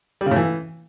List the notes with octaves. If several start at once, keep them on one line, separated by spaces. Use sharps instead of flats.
G3
C#3
A2
E3